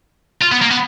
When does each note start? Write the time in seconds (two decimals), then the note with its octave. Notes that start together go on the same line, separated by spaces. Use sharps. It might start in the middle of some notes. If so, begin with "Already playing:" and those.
0.41 F4
0.51 B3
0.62 A#3
0.71 B3